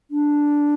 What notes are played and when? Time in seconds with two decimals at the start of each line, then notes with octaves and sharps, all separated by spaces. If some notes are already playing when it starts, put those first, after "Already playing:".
0.11 D4